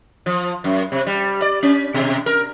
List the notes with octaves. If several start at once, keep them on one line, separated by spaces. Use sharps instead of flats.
F3
F#2
C3
G3
D5
C#4
B2
A#4